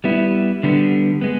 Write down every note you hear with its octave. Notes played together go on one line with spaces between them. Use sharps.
G3 B3 E4
D3 G3 B3
G#3 B3